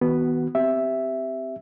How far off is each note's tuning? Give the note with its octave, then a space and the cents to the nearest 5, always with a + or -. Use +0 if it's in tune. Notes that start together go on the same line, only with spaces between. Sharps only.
D#3 +45 B3 +0 F#4 +20
C4 -10 G4 +0 E5 +0